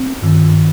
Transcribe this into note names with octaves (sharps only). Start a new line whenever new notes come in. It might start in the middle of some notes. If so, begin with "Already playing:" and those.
Already playing: C4
G2 D#3